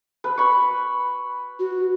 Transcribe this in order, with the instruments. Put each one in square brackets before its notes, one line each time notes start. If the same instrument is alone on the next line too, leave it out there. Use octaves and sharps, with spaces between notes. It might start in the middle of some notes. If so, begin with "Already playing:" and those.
[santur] B4
B5 C#6
[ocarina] F#4